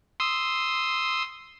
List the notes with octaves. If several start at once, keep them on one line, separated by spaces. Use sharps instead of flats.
C6 D#6 E6